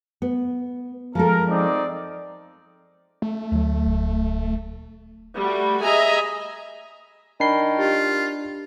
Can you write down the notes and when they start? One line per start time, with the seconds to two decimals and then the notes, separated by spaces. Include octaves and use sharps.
0.22 B3
1.15 F3 G#3 A4 A#4
1.49 C4 D#4 D5
3.22 A3
3.52 D2 F#3
3.87 D#1
5.34 G3 A3 F#4
5.83 G#4 D#5 E5 G#5 A#5
7.40 D#3 D4 B5 C7 G7
7.78 F4 G4